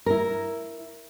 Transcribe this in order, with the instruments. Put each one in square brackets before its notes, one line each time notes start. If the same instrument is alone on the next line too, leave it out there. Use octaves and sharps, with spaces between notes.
[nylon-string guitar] E4 A#4